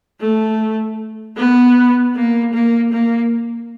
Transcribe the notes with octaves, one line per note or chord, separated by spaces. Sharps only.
A3
B3
A#3
A#3
A#3